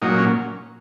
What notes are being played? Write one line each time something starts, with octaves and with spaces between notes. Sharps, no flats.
A#2 F#3 D#4
C#4